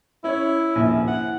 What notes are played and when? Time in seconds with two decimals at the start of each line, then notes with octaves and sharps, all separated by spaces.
0.24 C#4 E4 C#5
0.75 D#1 A#1
1.07 E4 F#5